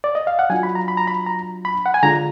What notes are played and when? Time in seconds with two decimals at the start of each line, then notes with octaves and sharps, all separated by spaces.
0.04 D5
0.15 D#5
0.27 F5
0.39 F#5
0.50 F#3 D4 F4 G#5
0.63 B5
0.75 A#5
0.88 B5
0.97 A#5
1.07 B5
1.26 A#5
1.65 B5
1.86 F#5
1.94 G#5
2.03 D3 G#3 D4 F4 A#5